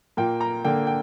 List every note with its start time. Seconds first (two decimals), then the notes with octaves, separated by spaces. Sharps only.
0.17 A#2 A#3 G5
0.41 A#5
0.64 D3 A#3 G5
0.87 G5